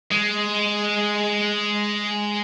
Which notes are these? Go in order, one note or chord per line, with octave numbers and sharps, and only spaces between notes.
G#3